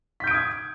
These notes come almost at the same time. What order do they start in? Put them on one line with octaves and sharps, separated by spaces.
B6 G6 D7 D#6 G#6